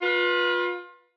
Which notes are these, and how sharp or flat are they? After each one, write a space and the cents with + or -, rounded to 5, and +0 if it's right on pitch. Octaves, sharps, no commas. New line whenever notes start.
F4 +25 B4 -20